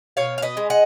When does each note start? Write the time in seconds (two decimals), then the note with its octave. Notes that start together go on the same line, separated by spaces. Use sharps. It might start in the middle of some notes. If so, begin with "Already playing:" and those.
0.17 B2 C#5 F5
0.38 F5
0.42 B4 D#5
0.57 G#3
0.70 D#5 F#5